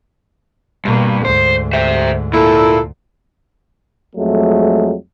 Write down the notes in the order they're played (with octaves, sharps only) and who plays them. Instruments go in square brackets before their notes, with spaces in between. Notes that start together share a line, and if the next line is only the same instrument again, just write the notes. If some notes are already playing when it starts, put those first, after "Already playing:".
[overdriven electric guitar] G2 [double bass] B2 A#3
[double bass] D2 G#2 [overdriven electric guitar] C5
[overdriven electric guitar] C5 E5
[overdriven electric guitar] A#2 [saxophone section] E4 A4
[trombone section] F2 F#3 G#3 A3